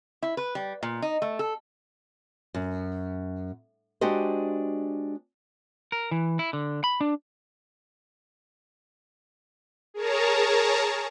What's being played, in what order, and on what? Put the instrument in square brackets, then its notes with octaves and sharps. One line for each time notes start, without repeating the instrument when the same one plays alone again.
[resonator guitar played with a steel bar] E4
B4
G3
A#2
D#4
A3
A4
[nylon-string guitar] F#2
G#3 D4 F#4 G4 C5 D#5
[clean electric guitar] A#4
E3
E4
D3
B5
D4
[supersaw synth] G#4 A#4 C#5 A5 A#5